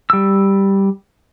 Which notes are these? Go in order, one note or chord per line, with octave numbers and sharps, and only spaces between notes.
G3 E6